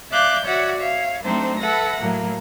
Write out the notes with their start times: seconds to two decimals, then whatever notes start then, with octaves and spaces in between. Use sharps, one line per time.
0.10 D5 E5 F5 D6 F#6 G6
0.45 F#4 C#5 D5 E5 F#5
0.79 C#5 E5 F5
1.23 F#3 A3 C4 D4 D#4 C5
1.59 A4 B4 E5 F#5 A#6
2.00 A2 F#3 A#3